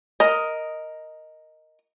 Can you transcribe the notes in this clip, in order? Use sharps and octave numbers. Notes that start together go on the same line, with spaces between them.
A#4 D#5